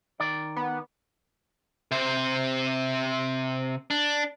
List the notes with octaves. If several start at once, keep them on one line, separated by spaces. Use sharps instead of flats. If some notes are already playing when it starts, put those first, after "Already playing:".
D#3 D5
B3
C3 C5
D4